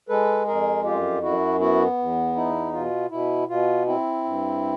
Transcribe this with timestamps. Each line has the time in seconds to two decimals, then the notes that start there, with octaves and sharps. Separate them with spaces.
0.09 G#3 A4 B4
0.47 F2 G#4 A#4
0.84 F#2 F4 G4
1.22 F#2 E4 F#4
1.59 B3 E4 F#4
1.98 E2
2.35 D#4 E4
2.73 B2 F4
3.10 B2 E4
3.48 B2 F4
3.86 C4 E4
4.24 G2